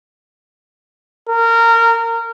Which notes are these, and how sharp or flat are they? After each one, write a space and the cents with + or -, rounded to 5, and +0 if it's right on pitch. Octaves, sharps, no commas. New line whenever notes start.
A#4 -20